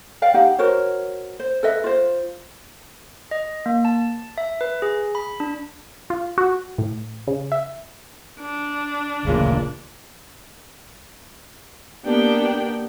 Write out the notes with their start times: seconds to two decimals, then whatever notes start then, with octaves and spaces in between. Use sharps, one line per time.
0.22 D5 F5 G5
0.34 D#4 G4 F#5
0.58 F#4 A#4 C5 C#5
1.40 C5
1.63 A4 B4 D#5 E5
1.84 F4 C5
3.31 D#5
3.66 A#3
3.85 A5
4.38 E5
4.61 B4
4.82 G#4
5.15 B5
5.40 D4
6.10 F4
6.38 F#4
6.78 A2
7.28 C#3
7.52 E5
8.40 D4
9.25 D1 A1 A#2 C#3
12.05 A#3 B3 D4 G4 G5